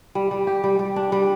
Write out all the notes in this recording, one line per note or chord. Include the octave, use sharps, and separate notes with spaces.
G3
G3
G4
G3
G3
D4
G3